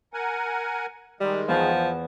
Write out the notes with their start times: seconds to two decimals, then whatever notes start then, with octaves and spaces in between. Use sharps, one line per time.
0.14 A#4 F#5 G#5
1.21 D#3 G3 G#3
1.48 E2 F3